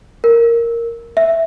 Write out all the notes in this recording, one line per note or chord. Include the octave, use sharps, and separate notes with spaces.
A#4
E5